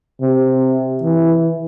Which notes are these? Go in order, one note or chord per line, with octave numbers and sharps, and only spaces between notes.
C3
E3